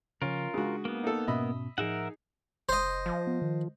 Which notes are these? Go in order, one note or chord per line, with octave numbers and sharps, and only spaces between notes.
C#3 F3 C#4 F4 A#4
C#3 G#3 D4 F#4
A#3 B3
D#4 A4
G#2 B2 C#4 D#5 E5 B5
A2 F3 D#4 G#4 A#4 E5 F#5
F#1 C5 D#5
F3
B3
D#3